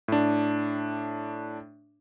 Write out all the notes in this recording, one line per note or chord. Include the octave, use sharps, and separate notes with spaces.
A2 D4